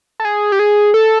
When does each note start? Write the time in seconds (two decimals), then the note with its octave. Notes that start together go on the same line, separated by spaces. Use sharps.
0.20 A4
0.25 G#4
0.52 G4
0.59 G#4
0.94 A4